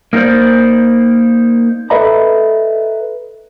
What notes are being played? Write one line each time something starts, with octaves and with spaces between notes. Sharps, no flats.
A#3 D#4 E4 C5 D5
A4 B4 D#5 E5 A#5 B5